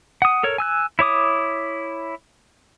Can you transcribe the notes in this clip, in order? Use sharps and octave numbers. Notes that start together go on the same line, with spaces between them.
F#5 D#6
A4 A#4 C#5
G#5 E6 F#6
E4 C#5 D6 D#6